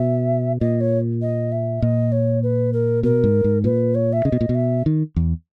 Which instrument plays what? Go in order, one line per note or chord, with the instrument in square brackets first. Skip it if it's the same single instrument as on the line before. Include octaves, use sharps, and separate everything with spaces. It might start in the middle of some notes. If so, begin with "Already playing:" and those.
Already playing: [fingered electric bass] B2 [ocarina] E5
[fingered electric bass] A#2 [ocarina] D#5
[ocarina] C#5
D#5
E5
[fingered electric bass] A#2 [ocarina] D#5
[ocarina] C#5
B4
A#4
[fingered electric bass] B2 [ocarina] A#4
[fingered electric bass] G#2
G#2
[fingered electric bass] A#2 [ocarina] B4
[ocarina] C#5
E5
[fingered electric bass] C#3 [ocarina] D#5
[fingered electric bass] B2
A#2
B2
[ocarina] E5
[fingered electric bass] D#3
E2